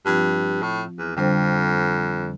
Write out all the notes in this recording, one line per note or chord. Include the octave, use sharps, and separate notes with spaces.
G2 F3 C4 F4
A2
E2
F2 D3 G3 D4 A4 C5